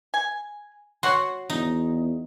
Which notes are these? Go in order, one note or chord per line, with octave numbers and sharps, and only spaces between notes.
G#5
F#4 C#5 F#5 C6
E2 D#4